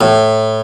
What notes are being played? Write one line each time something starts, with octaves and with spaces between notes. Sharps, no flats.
A2